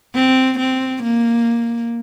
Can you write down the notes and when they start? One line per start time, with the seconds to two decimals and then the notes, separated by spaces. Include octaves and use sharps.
0.15 C4
0.59 C4
1.03 A#3